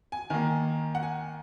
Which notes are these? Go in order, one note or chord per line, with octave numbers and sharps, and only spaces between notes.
G#5
D#3 A#3 G#5
F#5
G#5